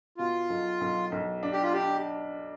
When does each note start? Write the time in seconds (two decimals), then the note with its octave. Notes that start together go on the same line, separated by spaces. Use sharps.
0.18 B2 F4
0.50 B1
0.81 B1
1.12 B1
1.43 D4
1.53 G4
1.63 F4
1.73 D4 G4